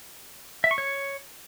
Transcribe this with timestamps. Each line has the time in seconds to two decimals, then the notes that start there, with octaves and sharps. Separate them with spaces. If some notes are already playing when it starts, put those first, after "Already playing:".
0.64 E5
0.71 C#6
0.78 C#5